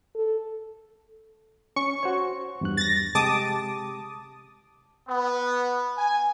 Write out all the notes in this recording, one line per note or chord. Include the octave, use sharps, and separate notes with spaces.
A4
C#4 C#6
F#4 C5 C#5
E2 G2 F#6
A6 A#6
C3 G#3 G4 A5 D6 D#6
B3
G#5